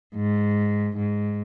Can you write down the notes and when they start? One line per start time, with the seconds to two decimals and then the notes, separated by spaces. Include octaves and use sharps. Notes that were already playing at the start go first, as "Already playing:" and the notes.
0.15 G#2
0.96 G#2